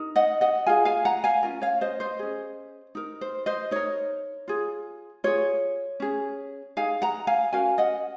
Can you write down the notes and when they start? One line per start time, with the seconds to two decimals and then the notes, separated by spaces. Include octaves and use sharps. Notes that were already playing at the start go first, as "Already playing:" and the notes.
Already playing: D#4 A#4
0.16 D#5 F#5
0.41 D#5 F#5
0.66 F4 G#4 F5 G#5
0.85 F5 G#5
1.05 F#5 A#5
1.24 F5 G#5
1.43 C#4 F4 A#4
1.62 C#5 F5
1.81 C5 D#5
2.00 C5 D#5
2.19 C#4 G#4
2.95 D#4 A#4
3.21 C5
3.46 C5 D#5
3.71 D#4 A#4 C#5
4.48 F4 G#4
5.24 F4 G#4 C#5
6.00 C#4 G#4
6.77 D#4 G#4 F5 G#5
7.02 F#5 A#5
7.27 F5 G#5
7.52 C#4 F#4 A#4 F5 G#5
7.78 D#5 F#5